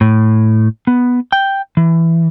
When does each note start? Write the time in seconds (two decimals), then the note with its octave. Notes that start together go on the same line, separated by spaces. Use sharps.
0.01 A2
0.87 B3
1.32 G5
1.77 E3